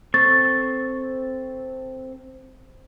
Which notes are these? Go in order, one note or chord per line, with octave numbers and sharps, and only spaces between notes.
C4 A4 C#6 A6